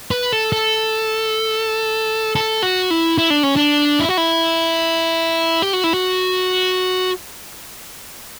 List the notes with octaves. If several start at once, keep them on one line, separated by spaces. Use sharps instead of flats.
B4
A4
A4
A4
F#4
E4
E4
D4
C#4
D4
E4
F#4
E4
G4
F#4
E4
F#4